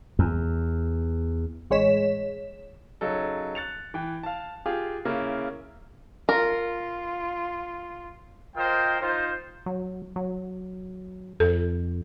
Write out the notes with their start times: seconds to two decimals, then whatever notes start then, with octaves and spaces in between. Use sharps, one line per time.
0.19 E2
1.70 A1 G#3 C#5 B6 E7
3.01 C#3 F#3 D#4 A4
3.55 F#6 A6 C#7 F7
3.94 E3 G5
4.23 F5 A5
4.66 F4 G4 G#4 F5
5.05 C#3 A#3 E4 A#4
6.29 F4 A#4
8.56 F4 A#4 C5 D#5 G5
9.01 D#4 F4 C5
9.66 F#3
10.16 F#3
11.40 F2 A4